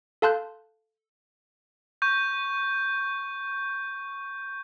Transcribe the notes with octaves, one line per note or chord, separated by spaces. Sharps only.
A4 F5 A5 C6 F#6 G6
C#6 G6